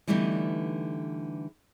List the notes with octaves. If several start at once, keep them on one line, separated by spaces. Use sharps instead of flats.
D3 E3 G3 A3 B3 D#4